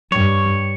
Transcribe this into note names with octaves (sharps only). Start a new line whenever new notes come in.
G2 C#5